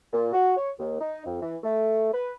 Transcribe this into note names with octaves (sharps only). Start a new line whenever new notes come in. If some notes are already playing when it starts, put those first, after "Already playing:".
A#2
F#4
C#5
D#2
D#4
F2
E3
A3
B4